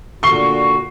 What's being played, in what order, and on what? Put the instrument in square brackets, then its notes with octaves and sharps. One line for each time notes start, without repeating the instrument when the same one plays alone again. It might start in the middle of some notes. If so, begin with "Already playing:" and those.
[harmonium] A#2 D3 F#4 [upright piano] C#6 C7 G7